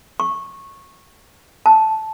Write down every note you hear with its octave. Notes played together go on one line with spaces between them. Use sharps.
C#6
A5